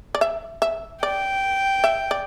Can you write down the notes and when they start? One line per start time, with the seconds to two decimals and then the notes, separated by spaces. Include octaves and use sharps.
0.15 D5
0.21 E5
0.62 E5
1.03 D5 G5
1.84 E5
2.11 D5